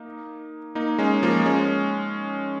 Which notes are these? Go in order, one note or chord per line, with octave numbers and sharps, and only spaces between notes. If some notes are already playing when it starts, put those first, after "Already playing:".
Already playing: A#3 D#4
A#3 D#4
G#3 C#4
F3 A#3
G#3 C#4